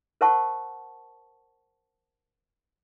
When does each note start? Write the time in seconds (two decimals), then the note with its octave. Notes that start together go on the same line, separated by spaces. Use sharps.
0.21 A#4 C5 E5 F#5 A5 C#6